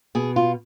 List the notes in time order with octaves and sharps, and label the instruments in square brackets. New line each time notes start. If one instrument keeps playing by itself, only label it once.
[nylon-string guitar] B2 G#4
F4